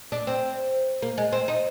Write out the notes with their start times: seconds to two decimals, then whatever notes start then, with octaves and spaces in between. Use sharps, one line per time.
0.12 D4
0.27 C4
1.02 A#3
1.18 G#3
1.33 C4
1.48 D#4